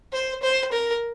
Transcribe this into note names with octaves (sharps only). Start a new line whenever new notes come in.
C5
C5
A#4